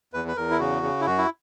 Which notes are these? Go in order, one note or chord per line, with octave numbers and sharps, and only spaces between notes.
E2 B4
B4
E2 A#4
E4
C#3 F#4
C#3
E4
F#2 F#4
E4